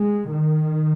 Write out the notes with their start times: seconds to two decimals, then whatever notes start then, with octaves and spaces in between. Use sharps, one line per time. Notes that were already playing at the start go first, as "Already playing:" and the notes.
Already playing: G#3
0.32 D#3